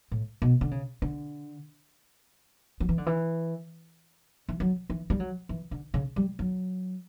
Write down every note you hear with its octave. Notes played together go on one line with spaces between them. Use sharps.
A2
B2
D3
C#3
D3
F#3
E3
D3
E3
E3
F#3
E3
G3
F#3
E3
D3
C#3
G3
F#3